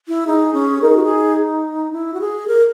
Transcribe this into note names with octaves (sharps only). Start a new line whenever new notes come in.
E4
D#4 G#4
C#4
D#4 A#4
G#4
F#4
G#4
E4
F#4
G#4
A#4